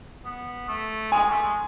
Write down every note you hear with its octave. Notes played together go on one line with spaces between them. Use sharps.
B3
A3
G#3 G#5
A3
G#3